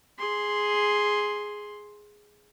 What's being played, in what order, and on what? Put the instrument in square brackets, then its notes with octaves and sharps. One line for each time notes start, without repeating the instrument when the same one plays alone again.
[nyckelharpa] G#4 C6